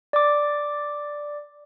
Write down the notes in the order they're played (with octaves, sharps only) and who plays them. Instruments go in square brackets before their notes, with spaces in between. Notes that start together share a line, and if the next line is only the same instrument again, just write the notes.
[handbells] D5 D6